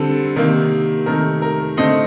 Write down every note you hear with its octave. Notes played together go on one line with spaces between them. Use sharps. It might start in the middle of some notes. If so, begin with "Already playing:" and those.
Already playing: D3 G3 C4 A4
C3 D#3 A#3
C3 D#3 A3 A#4
A#4
D3 A3 C4 D#5